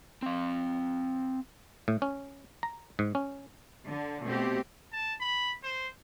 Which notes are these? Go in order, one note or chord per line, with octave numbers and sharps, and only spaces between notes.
C4 F5
A2
C#4
A#5
G#2
C#4
D3
B2 A3 C4 G4
A5
B5
C5